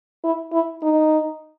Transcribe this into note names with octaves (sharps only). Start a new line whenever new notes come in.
E4
E4
D#4